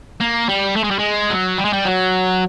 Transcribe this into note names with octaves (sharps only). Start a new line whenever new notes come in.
A#3
G3
A3
G#3
G3
G#3
F#3
G3
G#3
G3
F#3